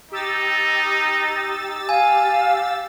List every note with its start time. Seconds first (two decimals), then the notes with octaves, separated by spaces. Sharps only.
0.11 D#4 G4 E6 A6
1.89 F5 G#5